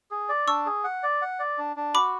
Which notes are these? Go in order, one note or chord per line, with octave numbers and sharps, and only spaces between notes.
G#4
D5
D4 C#6 E6
G#4
F#5
D5
F#5
D5
D4
D4
F#4 B5 D6